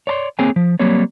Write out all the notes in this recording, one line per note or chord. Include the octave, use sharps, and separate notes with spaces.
C#5 D5 A5 C6
A#3 C4 G#4 C#5 G5 G#5
F3
F#3 G3 A#3 C4 C#5